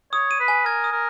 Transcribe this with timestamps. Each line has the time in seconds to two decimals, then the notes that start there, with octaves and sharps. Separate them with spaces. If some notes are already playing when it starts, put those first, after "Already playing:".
0.13 C#5 D#6
0.31 D#7
0.40 B4
0.48 G#5
0.66 A#4 G#6
0.84 D#6
0.92 A#4